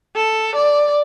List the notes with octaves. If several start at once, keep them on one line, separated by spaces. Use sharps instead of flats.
A4
D5